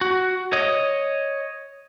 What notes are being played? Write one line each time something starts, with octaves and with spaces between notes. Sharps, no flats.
F#4
C#5 D#5